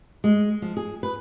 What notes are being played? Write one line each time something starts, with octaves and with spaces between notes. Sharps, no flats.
G#3
F3
G#4
B4